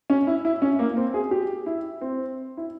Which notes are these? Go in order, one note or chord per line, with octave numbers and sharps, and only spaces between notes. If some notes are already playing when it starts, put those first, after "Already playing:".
C#4
E4
E4
C#4
A#3
C4
G#4
G4
E4
C4
E4